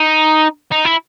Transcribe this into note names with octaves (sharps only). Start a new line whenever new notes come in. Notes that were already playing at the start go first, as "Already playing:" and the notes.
Already playing: D#4
D#4
E4